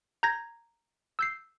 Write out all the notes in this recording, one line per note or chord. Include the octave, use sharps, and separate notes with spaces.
A#5 G6 G#6 A#6
E6 G6 C7